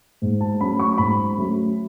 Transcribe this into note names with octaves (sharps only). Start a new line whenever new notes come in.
G#2
A5
F#3 A3 C#4 B5
C#6
G#2 B5
F#3 A3 C#4